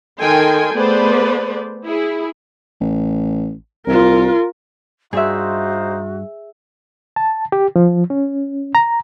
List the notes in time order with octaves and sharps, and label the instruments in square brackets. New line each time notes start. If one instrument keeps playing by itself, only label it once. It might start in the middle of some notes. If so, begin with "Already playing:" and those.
[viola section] D#3 A4 G5 G#5 C6
A3 B3 G#4 B4 C5 D5
E4 G#4
[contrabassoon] A1
[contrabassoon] C2 [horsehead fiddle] F4 A#4
[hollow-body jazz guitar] G2 [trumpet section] D#4 F4 C5 [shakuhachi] F#4 [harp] G#4 E5
[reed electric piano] A5
G4
F3
C#4
A#5